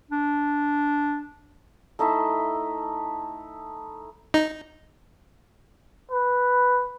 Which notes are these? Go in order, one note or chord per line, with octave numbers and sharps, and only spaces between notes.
D4
A3 D#4 E4 E5
D#4
B4